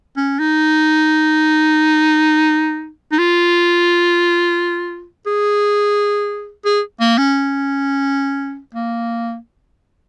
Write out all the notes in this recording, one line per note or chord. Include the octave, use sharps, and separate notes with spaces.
C#4
D#4
D#4
F4
G#4
G#4
A#3
C#4
A#3